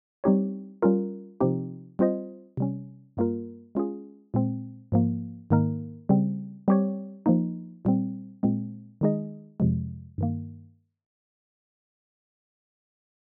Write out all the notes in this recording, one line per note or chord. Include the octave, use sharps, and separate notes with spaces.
G3 C4 D#4 G4 C#5
G3 C#4 F4 A#4
C3 F3 C4 D#4 G4
G3 C4 F4 C5 D#5
C3 G3 C#4
G2 G3 A#3 F4 A#4
G#3 C#4 F4 G#4
A#2 G#3 C4
G#2 F3 A#3
G#2 D#3 A#3 D#4 A#4
C#3 G3 C4
G3 C4 G4 C#5
F3 A#3 D#4
A#2 G3 C4
A#2 G#3 C4
D#3 G#3 D#4 G#4 D#5
F2 C3 F3 G#3
G2 D#3 A#3